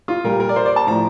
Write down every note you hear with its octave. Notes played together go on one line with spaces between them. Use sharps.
F4
A#2 G3 A#4
A#4
D5
C5
D5
A5
A2 F3 A#5